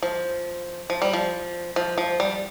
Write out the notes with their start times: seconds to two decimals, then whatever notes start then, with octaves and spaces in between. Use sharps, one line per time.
0.03 F3
0.90 F3
1.02 G3
1.13 F3
1.76 F3
1.98 F3
2.20 G3